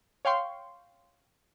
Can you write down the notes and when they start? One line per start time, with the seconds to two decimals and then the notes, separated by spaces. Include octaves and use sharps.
0.25 C#5 F5 G5 C6 C#6